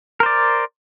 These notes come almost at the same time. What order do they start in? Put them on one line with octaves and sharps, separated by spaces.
A#4 C5 D5